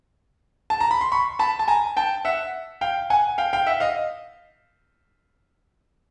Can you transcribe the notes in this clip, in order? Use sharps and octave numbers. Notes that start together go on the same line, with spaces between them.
A5
A#5
B5
C6
B5 C#6
A5 B5
A5
G#5 A#5
G5 A5
E5 F#5
F5 G5
F#5 G#5
F5 G5
F5 G5
E5 F#5
D#5 F5